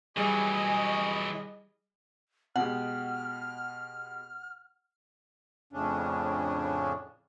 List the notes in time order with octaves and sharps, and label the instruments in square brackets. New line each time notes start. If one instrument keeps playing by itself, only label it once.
[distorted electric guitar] E3 F#3 [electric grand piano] G3 G#4 [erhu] D#5 [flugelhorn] G#5
[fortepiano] B2 G#3 G4 [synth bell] F#5 [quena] F6
[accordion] F2 A2 C#3 C#4 D4